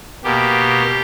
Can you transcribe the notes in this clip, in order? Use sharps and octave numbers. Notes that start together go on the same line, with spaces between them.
B2 A#3 G4